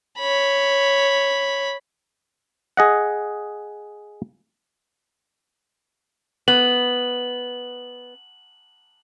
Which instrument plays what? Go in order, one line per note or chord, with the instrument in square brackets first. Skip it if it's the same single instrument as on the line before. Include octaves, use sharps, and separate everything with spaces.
[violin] C#5 B5
[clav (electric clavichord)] G#4 D#5 F#5
[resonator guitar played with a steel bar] B3 [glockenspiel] F#7